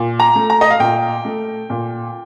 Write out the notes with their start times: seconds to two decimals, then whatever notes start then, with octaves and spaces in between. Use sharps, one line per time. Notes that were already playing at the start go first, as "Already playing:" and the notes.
Already playing: A#2
0.20 A#5
0.35 A3
0.50 A#5
0.61 D#5
0.70 F5
0.80 A#2 G5
1.25 A3
1.70 A#2